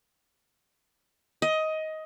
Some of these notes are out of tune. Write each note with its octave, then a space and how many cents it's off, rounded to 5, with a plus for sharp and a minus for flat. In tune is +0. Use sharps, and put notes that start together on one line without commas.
D#5 +15